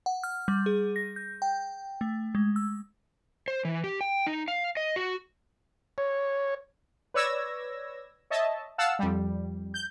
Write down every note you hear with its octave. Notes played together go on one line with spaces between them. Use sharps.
F#5
F6
G3
G#4
A#6
G6
G5
A3
G#3
E6
C5
E3
G4
G5
D#4
F5
D#5
F#4
C#5
B4 C#5 D5 E6 G#6 A#6
C#5 D#5 E5 A5
F5 F#5 A5 E6
F2 G3
G6